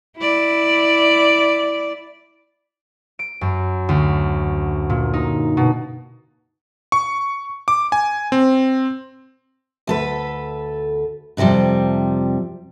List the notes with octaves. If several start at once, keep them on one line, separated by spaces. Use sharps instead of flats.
E4 D5
D7
F#2
D2
A#2
D#4
B2
C#6
D6
G#5
C4
D2 A4 B4
F2 C3 D#3 F3 G3